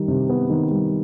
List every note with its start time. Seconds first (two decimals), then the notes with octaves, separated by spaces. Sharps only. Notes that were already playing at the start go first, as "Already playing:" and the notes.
Already playing: D#3 G3
0.08 C3
0.29 B3
0.50 D#3
0.71 G3